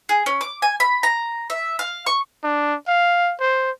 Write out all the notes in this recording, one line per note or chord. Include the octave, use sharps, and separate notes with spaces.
G#4
C#4
D6
G#5
B5
A#5
E5
F5
C#6
D4
F5
C5